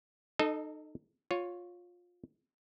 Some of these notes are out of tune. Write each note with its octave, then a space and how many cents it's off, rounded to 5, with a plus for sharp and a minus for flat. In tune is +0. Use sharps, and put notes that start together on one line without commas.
D#4 -30 A4 +0 D#5 +0
F4 +20 C#5 +0